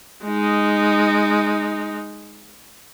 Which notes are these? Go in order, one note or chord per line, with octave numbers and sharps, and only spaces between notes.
G#3 D#4